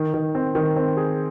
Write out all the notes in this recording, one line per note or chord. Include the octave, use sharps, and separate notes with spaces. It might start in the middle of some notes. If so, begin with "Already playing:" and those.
Already playing: D#3
D#3
C4
D#3
C4
G#4